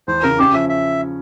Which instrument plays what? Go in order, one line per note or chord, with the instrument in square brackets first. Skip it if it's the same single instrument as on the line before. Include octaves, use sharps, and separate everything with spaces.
[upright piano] E2 [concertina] C5
[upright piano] C#3 [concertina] A#4
[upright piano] C#4 [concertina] G4
[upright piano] F3 [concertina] E5
[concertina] E5